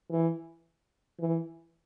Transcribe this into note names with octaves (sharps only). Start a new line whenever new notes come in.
E3
E3